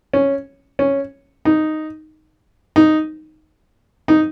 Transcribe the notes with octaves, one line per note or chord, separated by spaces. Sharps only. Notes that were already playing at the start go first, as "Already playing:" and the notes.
C#4
C#4
D#4
D#4
D#4